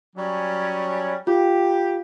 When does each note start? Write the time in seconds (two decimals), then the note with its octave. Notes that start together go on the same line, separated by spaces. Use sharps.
0.16 F#3 G3 C#4
1.27 F4 G4